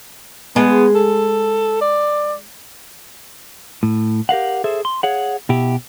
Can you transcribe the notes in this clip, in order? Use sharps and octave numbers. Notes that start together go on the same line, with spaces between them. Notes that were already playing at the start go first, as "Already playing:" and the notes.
G#3 B3
A4
D5
A2
G4 A#4 F5 F#5
G#4 A4 C5 E5
C6
G#4 C#5 F5 F#5
B2 E4 G4